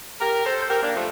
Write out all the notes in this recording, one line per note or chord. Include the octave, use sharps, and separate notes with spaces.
G4 A#4
A4 C5
C5
G4 A#4
A#3 D4
F3 A3